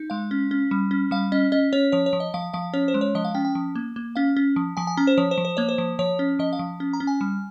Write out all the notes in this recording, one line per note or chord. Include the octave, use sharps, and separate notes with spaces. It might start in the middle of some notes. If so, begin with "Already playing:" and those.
Already playing: D#4
G#3 F5
C#4
C#4
G3
C#4
G3 F5
C#4 D#5
C#4 D#5
C#4 C#5
F3 C#5
C#5
F3
D#5
F3 F5
F3 F5
C#4 C#5
C5
G#3
C#5
F3 D#5
F5
C#4 G5
G5
F3
A#3
A#3
C#4 F5
C#4
F3
F3 G#5
G#5
C#4 A#5
C5
F3 C#5
C5
F3
C5
A#3 C#5
C5
F3
F3 C#5
C#4
F3 D#5
F5
F3
C#4
A#5
C#4
G#5
G3